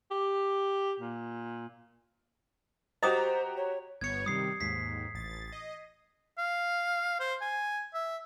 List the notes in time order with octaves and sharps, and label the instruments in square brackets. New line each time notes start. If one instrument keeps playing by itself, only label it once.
[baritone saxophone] G4
A#2
[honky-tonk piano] F#4 G4 A#5 [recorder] C5 [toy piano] D#5 D6 D#6
[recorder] C#5
[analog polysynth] G1 B3 C#5 [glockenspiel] G#6 C#7
[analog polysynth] C3 D#3 G3 [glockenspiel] D#6 C7
[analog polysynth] D#2 G#2 [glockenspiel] B6 C7
[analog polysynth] A1 A6
D#5
[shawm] F5
C5
G#5
E5